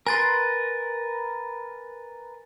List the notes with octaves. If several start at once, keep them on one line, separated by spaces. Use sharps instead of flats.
A#4 B4 G#5 C6 A6 A#6